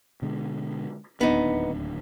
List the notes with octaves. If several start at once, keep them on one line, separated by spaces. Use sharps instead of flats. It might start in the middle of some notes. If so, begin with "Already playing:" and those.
B2 D3 G#3
D1 D#2 B3 D4 D#4